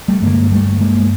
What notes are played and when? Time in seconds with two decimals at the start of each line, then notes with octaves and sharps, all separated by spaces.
0.08 G3 A3
0.22 G2 D3 G#3 A#3
0.52 G3 A3
0.80 G#3 A#3